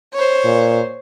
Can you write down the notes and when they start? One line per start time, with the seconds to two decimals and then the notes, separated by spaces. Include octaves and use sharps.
0.13 C5 C#5
0.44 A#2